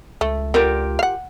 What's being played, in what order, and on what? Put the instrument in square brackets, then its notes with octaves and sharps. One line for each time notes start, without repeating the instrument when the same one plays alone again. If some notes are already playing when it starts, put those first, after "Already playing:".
[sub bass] C#2 [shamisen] A3
[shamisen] D3 [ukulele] F4 G4 A#4
[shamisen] F5 F#5